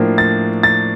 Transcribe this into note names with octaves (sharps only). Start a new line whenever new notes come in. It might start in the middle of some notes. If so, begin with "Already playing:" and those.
Already playing: A2 F3 A#3 D4
A6
A6